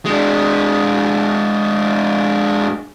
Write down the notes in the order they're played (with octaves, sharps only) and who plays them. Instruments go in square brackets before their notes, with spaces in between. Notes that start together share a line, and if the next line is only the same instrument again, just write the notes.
[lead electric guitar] G#3 D4